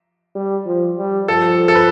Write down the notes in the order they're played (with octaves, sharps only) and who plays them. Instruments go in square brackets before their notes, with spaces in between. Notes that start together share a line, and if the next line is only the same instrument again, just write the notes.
[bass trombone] G3
F3
G3
[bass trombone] F3 [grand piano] A4
[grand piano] A4
B4